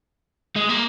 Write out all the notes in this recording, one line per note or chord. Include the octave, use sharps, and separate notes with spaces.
G#3
A#3